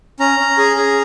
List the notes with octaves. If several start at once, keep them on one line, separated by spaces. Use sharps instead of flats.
C#4 A#5
C#4
G#4
G#4